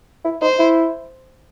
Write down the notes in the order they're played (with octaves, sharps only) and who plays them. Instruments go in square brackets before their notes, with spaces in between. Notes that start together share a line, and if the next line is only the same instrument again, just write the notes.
[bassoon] E4
[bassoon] D#4 [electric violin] C5
[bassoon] E4